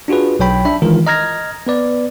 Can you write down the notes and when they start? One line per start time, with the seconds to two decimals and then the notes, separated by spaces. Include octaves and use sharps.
0.08 D4 F4 F#4 G#4 B4
0.39 B1 F#3 C#5 G5 B5
0.65 D4 E5 B5
0.82 D#3 E3 G#3 F4 A#4
1.07 D#5 A#5 F6 G#6 A#6
1.67 B3 B4 D5